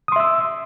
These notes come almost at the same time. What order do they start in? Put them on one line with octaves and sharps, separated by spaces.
D#6 C6 E5 E6